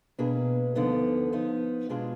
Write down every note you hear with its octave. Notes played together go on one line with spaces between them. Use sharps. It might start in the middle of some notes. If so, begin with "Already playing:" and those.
B2 A#3 D4 G#4 B4
D2 D3 F3 B3 D#4
F3 B3 D#4
B2 G#3 D4 F4 G#4